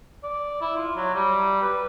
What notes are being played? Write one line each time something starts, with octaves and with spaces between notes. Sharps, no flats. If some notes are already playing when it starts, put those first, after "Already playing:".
D5
E4
F4
F#3
G3
B4